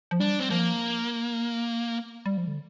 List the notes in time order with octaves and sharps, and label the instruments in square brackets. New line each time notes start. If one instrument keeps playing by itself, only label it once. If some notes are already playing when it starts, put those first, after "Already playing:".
[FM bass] F3
[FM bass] G3 [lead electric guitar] D4
[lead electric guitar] C4
[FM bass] F3 [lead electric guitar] A#3
[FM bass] G3
F3
D3